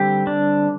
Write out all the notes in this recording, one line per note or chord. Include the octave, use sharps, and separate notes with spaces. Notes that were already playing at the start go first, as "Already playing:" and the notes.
Already playing: D3 G3 C4 G4
D4